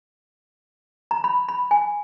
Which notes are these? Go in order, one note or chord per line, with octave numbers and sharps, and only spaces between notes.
A#5
B5
B5
G#5